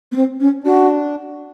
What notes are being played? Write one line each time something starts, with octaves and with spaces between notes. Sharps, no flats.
B3
C4
C#4
D4 F#4